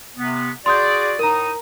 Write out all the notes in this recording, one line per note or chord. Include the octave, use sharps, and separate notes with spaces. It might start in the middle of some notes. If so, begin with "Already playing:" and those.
C3 B3
F#4 G#4 D5 C6 D#6 G6
A2 D#4 A#4 A#5 D#6